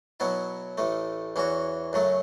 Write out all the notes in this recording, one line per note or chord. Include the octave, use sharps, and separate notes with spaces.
B2 F#3 B3 E4
A1 A2 A3
E2 E3 C#4 F#4
F#2 C#3 F#3 A3